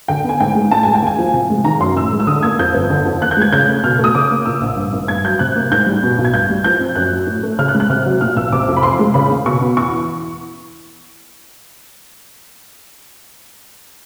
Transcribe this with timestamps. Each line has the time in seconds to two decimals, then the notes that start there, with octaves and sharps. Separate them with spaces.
0.08 D3 G5
0.24 B3
0.29 G#5
0.40 G#2 G5
0.55 G#3
0.71 A2 A5
0.83 G#3 G#5
0.95 G5
1.02 D#2 G#5
1.18 F3
1.34 C3
1.50 G#3
1.64 D#3 A#5
1.80 F#2 C6
1.96 A2 E6
2.12 G#3
2.20 E6
2.27 D3 D#6
2.43 A#3 G#6
2.59 F2 G6
2.74 G1
2.90 D3
3.05 F2
3.22 D#2 F#6
3.31 G6
3.37 G#3 G#6
3.52 C#3 G6
3.68 A3
3.84 B2 F6
3.99 A3
4.04 D#6
4.15 C#3 D6
4.31 A#3
4.46 A#2 E6
4.61 A#1
4.77 G2
4.93 G#1
5.08 G2 G#6
5.25 F#3 G6
5.39 C3 F#6
5.56 A#3
5.71 G#2 G6
5.86 G3
6.03 B2
6.19 B1
6.25 G#6
6.33 G2 G6
6.50 G3
6.64 F3 G6
6.80 C4
6.95 F#2 F#6
7.12 F#3
7.27 A2
7.43 A3
7.59 C#3 F6
7.68 F#6
7.75 G#3
7.80 F#6
7.90 C3 F6
8.06 F#3
8.21 A#2 F6
8.37 B1 E6
8.52 C3 D6
8.68 F2
8.77 B5
8.83 C3 C6
8.99 G#3
9.14 C#3 B5
9.30 D#2
9.45 B2 C#6
9.61 B3
9.77 E2 C#6
9.92 E3